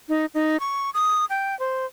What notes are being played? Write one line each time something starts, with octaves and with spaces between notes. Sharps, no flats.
D#4
D#4
C#6
D#6
G5
C5